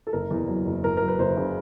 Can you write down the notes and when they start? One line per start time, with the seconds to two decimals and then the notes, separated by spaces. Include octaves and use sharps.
0.07 A4
0.13 F#1 A#4
0.30 E2
0.48 F#3
0.66 F#1
0.84 F#1 A#4
0.97 F#3 A#4
1.08 B4
1.19 F#1 C5
1.37 C#3